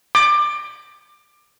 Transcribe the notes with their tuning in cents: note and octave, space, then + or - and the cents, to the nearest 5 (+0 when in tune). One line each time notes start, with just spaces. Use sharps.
D6 +20